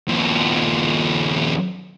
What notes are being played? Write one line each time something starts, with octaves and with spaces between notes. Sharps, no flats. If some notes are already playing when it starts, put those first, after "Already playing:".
D#2 F3